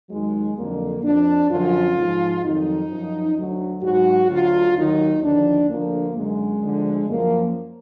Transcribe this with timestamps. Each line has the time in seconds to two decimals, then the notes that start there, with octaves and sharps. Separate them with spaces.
0.10 D#2 D#3 F#3 G#3
0.57 F2 D3 F#3 A#3
1.04 F2 F3 D4
1.51 F#2 D3 F3 F4
1.97 G#2 F3
2.44 F2 D#3 F#3 D#4
2.91 F#2 F3
3.37 D2 D3 F#3
3.83 G#2 F#3 F#4
4.30 D2 D3 F#3 F4
4.77 D#2 D#3 F#3 D#4
5.23 D#2 D3 F3 D4
5.69 D2 D3 F3 A#3
6.16 F#2 D3 F#3 G#3
6.63 D2 D3 F3
7.10 F#2 F3 A#3